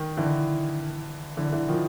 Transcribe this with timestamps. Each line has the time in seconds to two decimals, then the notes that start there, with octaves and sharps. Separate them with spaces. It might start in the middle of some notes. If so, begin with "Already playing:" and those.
Already playing: D#3
0.17 D3 E3
1.37 D3 E3
1.52 D3 E3
1.68 D#3 F3